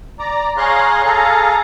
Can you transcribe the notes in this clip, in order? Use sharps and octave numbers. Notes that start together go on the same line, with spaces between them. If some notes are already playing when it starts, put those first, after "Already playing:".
D5 A#5
G#4 C#5 F5 A#5 C6 F#6
G#4 A4 F5 A#5